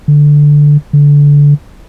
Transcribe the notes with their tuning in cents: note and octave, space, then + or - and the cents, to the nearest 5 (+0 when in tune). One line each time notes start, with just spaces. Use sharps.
D3 +0
D3 -20